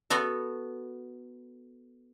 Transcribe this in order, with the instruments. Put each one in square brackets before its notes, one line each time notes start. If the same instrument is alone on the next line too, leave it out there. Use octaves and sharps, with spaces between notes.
[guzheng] B3 F#4 A4